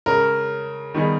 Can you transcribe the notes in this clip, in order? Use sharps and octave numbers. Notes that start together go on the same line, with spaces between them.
C#3 G#3 C#4 A#4
D#3 G3 B3 D#4 G#4